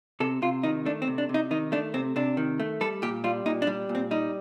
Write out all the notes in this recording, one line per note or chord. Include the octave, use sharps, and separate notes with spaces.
C3 A4
C3 F4
D#3 D#4
A3 D4
C4
C3
D4
C3
D#4
D#3 D#4
A3 D4
C3 C4
C3 D4
D#3
A3
G3 A4
A#2 G4
G3 F4
A#2 D#4
D4
G3
A#2
C4
G3 D#4